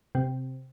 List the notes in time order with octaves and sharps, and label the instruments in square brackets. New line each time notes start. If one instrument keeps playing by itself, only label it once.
[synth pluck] C3